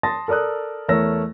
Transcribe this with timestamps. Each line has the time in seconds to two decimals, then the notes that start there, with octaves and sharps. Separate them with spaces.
0.03 A5 C6 D#6 A6 A#6
0.28 A4 A#4 D5 D#6 F#6
0.88 E2 A3 A#4 C#5 E6 A#6